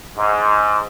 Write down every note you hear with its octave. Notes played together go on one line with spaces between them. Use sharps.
G#2